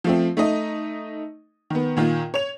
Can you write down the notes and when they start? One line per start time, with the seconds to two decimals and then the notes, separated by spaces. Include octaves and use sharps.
0.04 F3 A3 C4
0.37 A3 D#4 D#5
1.70 D#3 B3
1.97 A#2 D#3 F4
2.34 C#5 F7